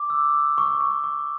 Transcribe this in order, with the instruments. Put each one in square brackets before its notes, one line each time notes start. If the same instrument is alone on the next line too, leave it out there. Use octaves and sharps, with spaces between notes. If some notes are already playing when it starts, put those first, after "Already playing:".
Already playing: [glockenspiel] D6
E6
E6
C#6
C#6
C#6